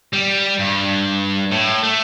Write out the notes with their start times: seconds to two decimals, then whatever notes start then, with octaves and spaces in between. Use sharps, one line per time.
0.13 G3
0.59 G2
1.52 A2
1.83 A3